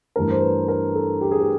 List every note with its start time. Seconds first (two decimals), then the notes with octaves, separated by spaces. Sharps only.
0.16 G2 E3 A3 D4 A#4
0.30 C5
0.42 B4
0.68 A#4
0.95 A4
1.21 G4
1.31 G#4
1.40 G4